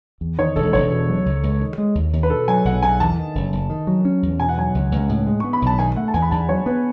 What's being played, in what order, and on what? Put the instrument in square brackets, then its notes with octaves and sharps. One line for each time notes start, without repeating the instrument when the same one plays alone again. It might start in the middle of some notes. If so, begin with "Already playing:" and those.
[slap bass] E2
[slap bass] D#3 [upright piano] C#5
[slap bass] E1 [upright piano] A4
[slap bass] E1 [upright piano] C#5
[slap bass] B2
F#3
C#2
C#2
D#3
G#3
D#2
D#2
[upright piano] B4
[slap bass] B2 [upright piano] A4
[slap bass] F#3 [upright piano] G#5
[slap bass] B1 [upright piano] F#5
[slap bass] B1 [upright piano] G#5
[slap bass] E2 [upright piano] A5
[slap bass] D#3
F#1
F#1
D#3
F#3
C#4
E2
[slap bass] B2 [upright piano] G#5
[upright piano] F#5
[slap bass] F#3 [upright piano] G#5
[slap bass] C#2
C#2
A2
G#3
[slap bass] B3 [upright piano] C#6
[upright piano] B5
[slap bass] B1 [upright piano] A5
[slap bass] D#3 [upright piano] G#5
[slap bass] A3 [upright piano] F#5
[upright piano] A5
[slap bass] E2 [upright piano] G#5
[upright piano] B5
[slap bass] E2 [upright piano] A5
[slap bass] F#3 [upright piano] C#5
[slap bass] B3 [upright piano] B4